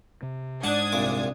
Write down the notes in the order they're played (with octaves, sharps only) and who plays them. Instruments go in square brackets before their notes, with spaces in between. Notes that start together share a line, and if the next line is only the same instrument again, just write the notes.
[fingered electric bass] C3
[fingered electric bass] G#2 G#3 [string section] D4 D#6 G#6 [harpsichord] F#5 A5
[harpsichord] C2 A#2 D6